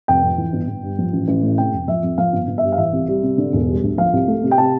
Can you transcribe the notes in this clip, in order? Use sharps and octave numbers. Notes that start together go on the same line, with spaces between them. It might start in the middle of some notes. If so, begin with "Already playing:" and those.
F1 G5
F2
E3
G1
G1
G2
F3
A1
A1
A2
C3 G5
F1
F3 E5
F2
F3 F5
G1
G1
E5
G2
F5
E3 E5
C2
G3
C3
D3
E1
G3
D2
F3 F5
C2
A3
C3
G5
C3 A5